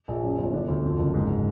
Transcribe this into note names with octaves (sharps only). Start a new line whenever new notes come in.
A#1
F#2
G1
D3
D2
F2
F#1
G#2